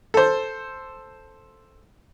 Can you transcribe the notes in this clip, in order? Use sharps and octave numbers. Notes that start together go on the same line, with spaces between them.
A4 C5